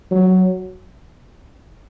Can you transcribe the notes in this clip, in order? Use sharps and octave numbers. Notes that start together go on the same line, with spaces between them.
F#3